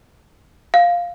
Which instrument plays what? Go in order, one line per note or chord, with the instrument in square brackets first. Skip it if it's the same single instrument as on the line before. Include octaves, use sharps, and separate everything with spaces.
[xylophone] F5